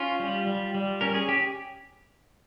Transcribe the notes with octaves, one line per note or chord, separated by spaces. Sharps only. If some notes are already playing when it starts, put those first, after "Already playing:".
Already playing: C#4 F4
G3
G3
G3
C#4 A#4
G#4
G4